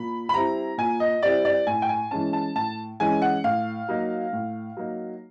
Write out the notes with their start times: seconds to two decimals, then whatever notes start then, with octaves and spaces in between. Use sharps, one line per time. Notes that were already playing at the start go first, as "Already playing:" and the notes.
Already playing: A#2 B5
0.29 B5
0.34 G3 C4 E4 A#5
0.78 A#2 G#5
1.00 D#5
1.22 G3 C4 E4 D5
1.45 D5
1.67 A2 G#5
1.82 G5
1.89 G#5
2.11 E3 G#3 C#4 A5
2.33 A5
2.56 A2 A5
3.00 E3 G#3 C#4 G#5
3.22 F#5
3.44 A2 F5
3.89 F#3 A#3 D#4
4.33 A2
4.77 F#3 A#3 D#4